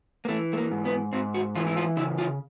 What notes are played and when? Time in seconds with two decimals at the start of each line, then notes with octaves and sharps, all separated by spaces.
0.25 A#3
0.29 E3 A3
0.53 A3
0.57 A#3
0.71 G#2
0.85 B3
1.13 G#2 C4
1.34 F#4
1.55 E3 F4
1.67 E4
1.77 F4
1.97 C#3 E4
2.18 F4